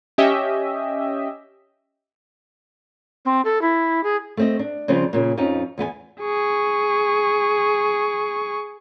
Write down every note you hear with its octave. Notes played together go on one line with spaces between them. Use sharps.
C#4 G4 D#5 E5
C4
A4
E4
G#4
A3 C4 D#5
D4
C#3 F3 G3 C4 C#4
A#2 C#3 A#3
F2 F3 C#4 D#4
E2 B3 B4 G#5
G#4 C#6